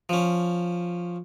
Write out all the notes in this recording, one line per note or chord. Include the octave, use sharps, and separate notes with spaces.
F3 C#4